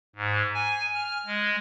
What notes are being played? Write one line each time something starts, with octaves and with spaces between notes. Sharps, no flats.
G#2
G#5
F6
G#3